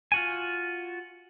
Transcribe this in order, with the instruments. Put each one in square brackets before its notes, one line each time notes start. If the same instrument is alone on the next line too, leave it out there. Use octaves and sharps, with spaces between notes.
[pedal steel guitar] F4 F#4 G#5